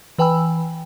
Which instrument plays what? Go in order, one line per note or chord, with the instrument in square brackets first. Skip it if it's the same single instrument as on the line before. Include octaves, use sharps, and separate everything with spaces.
[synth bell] E3 B4 G5 G#5 B5 E6